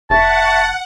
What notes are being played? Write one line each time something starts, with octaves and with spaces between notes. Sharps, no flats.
F1 E5 F#5 A5 C#6